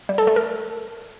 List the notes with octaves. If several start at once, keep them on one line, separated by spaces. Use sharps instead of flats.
G3
A4
A3
A#4